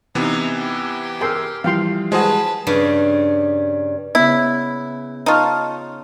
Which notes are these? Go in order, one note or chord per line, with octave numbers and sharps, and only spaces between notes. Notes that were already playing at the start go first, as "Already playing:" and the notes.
C3 E3 B3 C4 D#4
G4
G#4 A#4 G5 C6 E6 F6
E3 F3 G3 F5 G5 C6
G#3 F#4 G#4 B4 C5 D#5 A5
G2 C#3 G3
C#3 B3 E4
D#4 F4 A5 C#6 F6